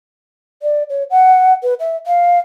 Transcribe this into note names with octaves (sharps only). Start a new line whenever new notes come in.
D5
C#5
F#5
B4
E5
F5